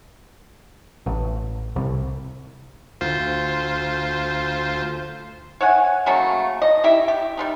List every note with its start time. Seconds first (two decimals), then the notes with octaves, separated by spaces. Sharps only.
1.06 A1
1.76 C2
3.01 D2 F4 C5
5.61 C#5 E5 F#5 G#5
6.06 C#3 F#3 A3 A#3
6.62 D#5
6.84 E4 G4 E5
7.08 G4
7.37 G3 C4 D#4